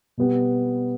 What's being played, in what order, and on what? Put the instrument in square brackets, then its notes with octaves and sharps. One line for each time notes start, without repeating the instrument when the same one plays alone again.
[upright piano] B2 G3 B3